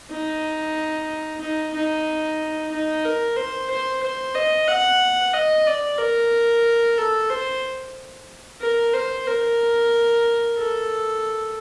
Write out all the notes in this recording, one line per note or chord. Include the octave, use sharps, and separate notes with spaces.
D#4
D#4
D#4
D#4
A#4
C5
C5
C5
D#5
F#5
D#5
D5
A#4
A4
C5
A#4
C5
A#4
A4